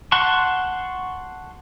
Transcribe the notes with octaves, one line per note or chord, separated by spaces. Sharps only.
F#5 A5 C6 C#6